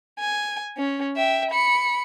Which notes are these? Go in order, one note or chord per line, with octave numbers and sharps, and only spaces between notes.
G#5
C#4
E5 G5
B5 C#7